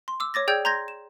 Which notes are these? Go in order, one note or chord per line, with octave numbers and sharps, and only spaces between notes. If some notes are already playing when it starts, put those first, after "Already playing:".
C6
D6 E6
C#5 D6 A6 A#6
G#4 D5 G5 E6 G6 G#6
A#5 C6 G6 G#6 A#6
E7